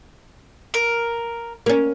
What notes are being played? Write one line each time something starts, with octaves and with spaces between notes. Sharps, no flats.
A#4
A#3 C#4